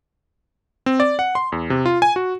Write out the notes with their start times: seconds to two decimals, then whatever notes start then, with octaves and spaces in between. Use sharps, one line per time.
0.86 C4
1.00 D5
1.19 F#5
1.35 C6
1.52 E2
1.70 C3
1.86 F4
2.02 G#5
2.16 F#4